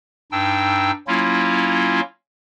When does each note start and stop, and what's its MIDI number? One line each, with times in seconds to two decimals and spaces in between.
0.32 0.91 43
0.32 0.91 62
0.32 0.91 63
0.32 0.91 79
0.32 0.91 88
1.07 2.00 54
1.07 2.00 58
1.07 2.00 61
1.07 2.00 64
1.07 2.00 65